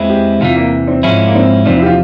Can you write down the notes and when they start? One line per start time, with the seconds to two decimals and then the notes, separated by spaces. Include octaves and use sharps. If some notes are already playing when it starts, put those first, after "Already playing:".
Already playing: E2 E3 G#3 C4 E4
0.10 G4
0.41 E2 C3 E3 F4
0.56 A#3
0.88 C4
1.03 G#2 F3 G#3 C#4 E4
1.27 A#3
1.35 C4
1.65 E2 C3 F3 C4
1.76 E4
1.82 G4
1.86 F4